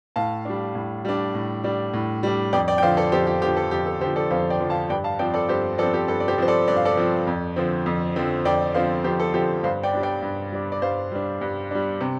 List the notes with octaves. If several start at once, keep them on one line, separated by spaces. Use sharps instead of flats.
A2 F5 A5
G3 D4
A2
G3 D4
A2
G3 D4
A2
G3 D4
F2 D5 G5
D5 G5
G5
D3 F3 C5 F5
A4 D5
F2 G4 C5
G4
D3 F3 G4
A4
F2 G4
A4
D3 F3 G4 C5
A4 D5
F2 C5 F5
D5 G5
D3 F3
F5 A5
G2 D5 G5
F5 A5
F3 C4 D5 G5
A4 D5
G2 G4 C5
F3 C4 A4 D5
G4 C5
G2 A4
D5
G4 C5
F3 C4 C5
A4 D5
G2 D5
F5
A4 D5
F3 C4
F2
D3 F3 C4
F2
D3 F3 C4
F2 D5 G5
D3 F3 C4 C5 F5
F2 G4 C5
A4
D3 F3 C4 G4 C5
G2 C5 F5
D5 G5
G3 D4
D5 G5
G2
G3 D4
D5
G2 C5 F5
G3 D4
G2
G3 D4
C3